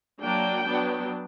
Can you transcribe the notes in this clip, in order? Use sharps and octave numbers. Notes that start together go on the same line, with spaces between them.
F#3 A#3 D4 G5
F#3 B3 D4